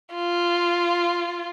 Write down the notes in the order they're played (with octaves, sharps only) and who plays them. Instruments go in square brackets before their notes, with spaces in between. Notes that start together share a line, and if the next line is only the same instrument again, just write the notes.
[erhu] F4